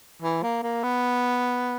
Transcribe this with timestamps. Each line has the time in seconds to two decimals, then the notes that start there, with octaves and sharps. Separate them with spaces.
0.22 E3
0.43 A#3
0.63 A#3
0.83 B3